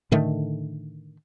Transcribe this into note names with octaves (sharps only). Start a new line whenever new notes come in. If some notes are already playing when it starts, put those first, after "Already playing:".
A2 D3 D#3 A3